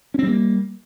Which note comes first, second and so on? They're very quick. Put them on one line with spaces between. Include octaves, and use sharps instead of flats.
C#4 C4 G3 A#3